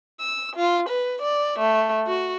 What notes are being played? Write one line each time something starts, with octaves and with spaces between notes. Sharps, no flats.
E6
F4
B4
D5
A3
F#4